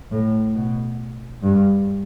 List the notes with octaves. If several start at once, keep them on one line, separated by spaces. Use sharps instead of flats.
A2
B2
G2